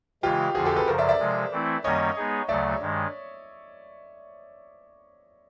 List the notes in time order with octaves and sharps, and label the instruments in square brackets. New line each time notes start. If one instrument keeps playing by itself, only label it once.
[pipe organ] C#3 E3 G#3 [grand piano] F4 G4
[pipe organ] F2 D3 F3 [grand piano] F#4 G#4
[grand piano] G4 A4
A4 B4
[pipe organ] F#2 C#3 F3 [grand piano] A#4 C5
[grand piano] D5 E5
D5 E5
[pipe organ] C3 F3 G#3
E3 A3 C4 E4
[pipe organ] F#2 D#3 G3 A#3 C#4 [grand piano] C#5 D#5
[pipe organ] G#3 B3 D#4 G#4
[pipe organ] D2 C#3 F#3 A3 [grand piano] D5 E5
[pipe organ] G2 D#3 G#3